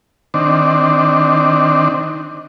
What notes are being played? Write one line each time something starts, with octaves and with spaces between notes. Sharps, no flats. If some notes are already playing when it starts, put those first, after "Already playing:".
D#3 C4 D4